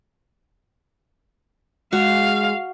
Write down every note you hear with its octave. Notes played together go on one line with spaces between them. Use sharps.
G#3 F#4 F5